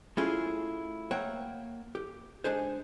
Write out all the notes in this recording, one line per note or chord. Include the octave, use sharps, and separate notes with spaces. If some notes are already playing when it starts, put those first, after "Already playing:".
A3 C#4 E4 F4 G#4
A#3 C#5 E5 F#5 G5
G4
G#3 D4 D#4 G#4 C5